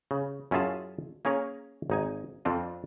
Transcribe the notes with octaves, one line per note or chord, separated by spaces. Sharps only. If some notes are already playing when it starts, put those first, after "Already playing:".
C#3
F#2 C#4 E4 F4 G#4 A5
A#3 C#4 G#4 A#4 C#5
G#1 D#4 G#5
F2 C4 D4 F4